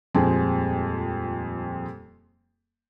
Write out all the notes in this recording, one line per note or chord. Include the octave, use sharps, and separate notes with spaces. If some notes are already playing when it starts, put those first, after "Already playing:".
D#1 F2 G#3 C4 G#5 A5